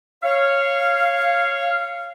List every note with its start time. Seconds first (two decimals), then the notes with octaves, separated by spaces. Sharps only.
0.23 C#5 F5